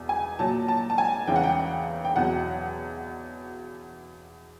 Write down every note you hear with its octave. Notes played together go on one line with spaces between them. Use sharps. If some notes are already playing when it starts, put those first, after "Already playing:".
Already playing: E2 B2
G#5
A#2 F#3 A5
A5
A5
G#5
E2 C#3 E3 G5
F#5
G5
G5
E2 B2 F#3 F#5